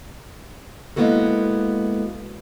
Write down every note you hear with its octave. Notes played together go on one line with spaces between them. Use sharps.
G#3 A#3 B3 E4 F#4 A4